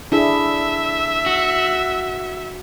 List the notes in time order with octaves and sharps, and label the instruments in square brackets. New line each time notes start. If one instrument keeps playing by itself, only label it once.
[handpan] D4 E4 G#4 [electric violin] E5
[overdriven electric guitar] F#4